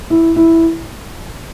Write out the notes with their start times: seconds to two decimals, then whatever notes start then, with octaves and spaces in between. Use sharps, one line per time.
0.10 E4
0.36 E4